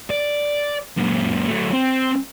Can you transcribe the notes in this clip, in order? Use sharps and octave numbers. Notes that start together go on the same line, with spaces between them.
D5
F#2 A#2
F#3 A3
C4